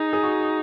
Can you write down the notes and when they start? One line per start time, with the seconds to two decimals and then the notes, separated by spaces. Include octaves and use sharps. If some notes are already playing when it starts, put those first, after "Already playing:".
Already playing: D#4 G#4
0.13 G#4
0.23 F#4